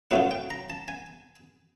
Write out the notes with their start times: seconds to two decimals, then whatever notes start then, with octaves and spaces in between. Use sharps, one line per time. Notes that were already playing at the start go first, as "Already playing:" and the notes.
0.11 A2 F#3 A3 C#4 F4 F#5
0.31 G5
0.50 A#5
0.70 A5
0.88 G#5